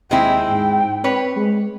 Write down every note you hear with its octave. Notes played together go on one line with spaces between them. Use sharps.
D#2 G#3 C4 E4 G5
G#2
C4 B4 C#5
G#3